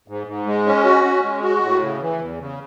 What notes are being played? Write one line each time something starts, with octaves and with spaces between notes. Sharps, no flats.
G#2
G#2
G#3
C#4
F#4
C#4
G#3
F#4
A2
C#3
E3
E2
C#3